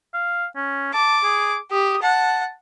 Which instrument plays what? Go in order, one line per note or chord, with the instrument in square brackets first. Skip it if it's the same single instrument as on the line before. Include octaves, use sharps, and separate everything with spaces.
[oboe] F5
C#4
[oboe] A5 [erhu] D6
[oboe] G#4
[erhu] G4 [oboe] D#6
[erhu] F#5 [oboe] A5